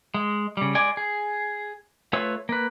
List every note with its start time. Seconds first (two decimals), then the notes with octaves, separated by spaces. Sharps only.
0.14 G#3
0.57 C#3 G3
0.75 G#3 D5 G#5
0.97 G#4
2.13 A3 F4 B4 C#5 E6
2.49 A#3 B4